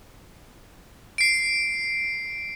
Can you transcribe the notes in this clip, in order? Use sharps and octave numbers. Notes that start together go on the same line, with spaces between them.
C7 D7